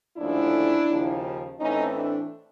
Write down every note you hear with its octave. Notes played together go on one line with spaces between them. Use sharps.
D#2 D3 F3 A3 C#4 D4 E4
D#2 C#3 F3
A2 E3 A3 C4 C#4 D#4
D4